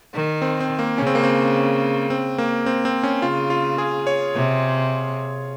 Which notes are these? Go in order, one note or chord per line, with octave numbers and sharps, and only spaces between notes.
D#3
C4
C4
A#3
C#3 C#4
C4
A#3
C4
C4
A#3
C4
C4
C#4
C#3 F4
F4
G#4
C#5
C3